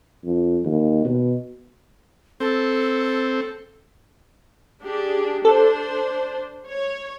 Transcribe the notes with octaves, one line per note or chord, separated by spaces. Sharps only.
F2
D#2
B2
C4 A4
D4 G4 G#4
D4 A4 C5
C#5